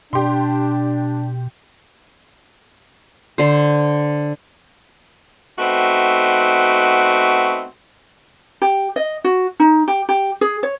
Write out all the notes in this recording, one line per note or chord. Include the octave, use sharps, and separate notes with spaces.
B2 D4 G4 C6
D3 C5
A3 B3 C4 D#4 F#4
G4
D#5
F#4
D#4
G4
G4
G#4
C#5